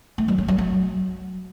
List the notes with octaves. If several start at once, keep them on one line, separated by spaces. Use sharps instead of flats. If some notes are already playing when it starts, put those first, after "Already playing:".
A3
F#3
C#4
F#3
F#3